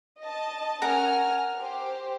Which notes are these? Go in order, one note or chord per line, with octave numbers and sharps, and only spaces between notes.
D#5 A5
C#4 A#4 F#5 G#5 A#5 F6
G4 C5